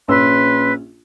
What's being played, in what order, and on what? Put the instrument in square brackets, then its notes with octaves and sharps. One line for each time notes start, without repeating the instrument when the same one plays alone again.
[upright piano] A#1 C#4 E6 [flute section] B4 C6